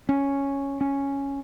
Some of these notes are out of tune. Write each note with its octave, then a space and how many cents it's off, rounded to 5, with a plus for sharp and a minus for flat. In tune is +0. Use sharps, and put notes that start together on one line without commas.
C#4 +0
C#4 +0